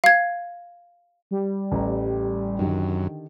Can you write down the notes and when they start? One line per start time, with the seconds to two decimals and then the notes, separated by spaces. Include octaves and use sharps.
0.04 F5 G#6
1.31 G3
1.72 A1 A3 A#5
2.59 F#2 D3 D#3 G4